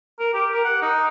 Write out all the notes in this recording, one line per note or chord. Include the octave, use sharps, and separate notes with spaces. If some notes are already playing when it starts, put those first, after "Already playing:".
A#4
G4
A#4
F#5
D#4